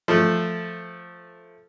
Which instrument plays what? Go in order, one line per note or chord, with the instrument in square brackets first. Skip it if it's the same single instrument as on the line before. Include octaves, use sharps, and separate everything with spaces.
[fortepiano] F3 A3